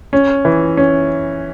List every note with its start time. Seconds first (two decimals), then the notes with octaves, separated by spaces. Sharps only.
0.13 C#4
0.45 E3
0.77 C#4